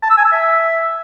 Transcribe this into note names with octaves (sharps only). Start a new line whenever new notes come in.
A5
E6
G#5
E6
E5